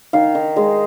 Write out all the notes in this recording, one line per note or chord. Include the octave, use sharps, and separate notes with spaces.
D#3 F5
D#3
G#3